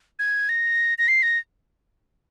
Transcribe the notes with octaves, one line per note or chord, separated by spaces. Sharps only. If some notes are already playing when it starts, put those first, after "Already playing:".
G#6
A#6
A#6
C7
A#6